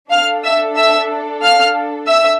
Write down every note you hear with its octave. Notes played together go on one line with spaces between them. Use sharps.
D4 A4 F5 F6
E5 E6
E5 E6
F5 F6
E5 E6